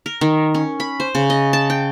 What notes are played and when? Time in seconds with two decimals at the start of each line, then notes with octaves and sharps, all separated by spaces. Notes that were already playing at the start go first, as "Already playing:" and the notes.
0.06 A#4
0.21 D#3
0.54 C#4
0.80 B5
1.00 C5
1.15 C#3
1.30 D#5
1.53 A5
1.70 G5